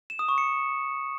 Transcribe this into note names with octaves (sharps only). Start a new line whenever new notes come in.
E7
D#6
C#6
C#7